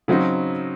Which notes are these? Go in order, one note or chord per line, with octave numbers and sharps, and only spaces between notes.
C#3 F#3 C4 D#4